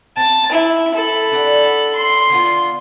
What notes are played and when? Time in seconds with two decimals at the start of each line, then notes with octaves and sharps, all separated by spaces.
0.17 C4 A5
0.52 E4
0.95 A4 B5
1.32 D4 D5 F#5
1.96 C6
2.30 D3 B3 F4